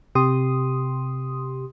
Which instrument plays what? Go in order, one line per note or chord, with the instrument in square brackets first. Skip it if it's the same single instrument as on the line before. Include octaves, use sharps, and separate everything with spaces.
[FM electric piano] C3 G4 C6 D#6